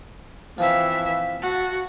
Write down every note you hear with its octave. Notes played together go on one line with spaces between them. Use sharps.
E3 F3 C4 E5
F#4 F#5 A5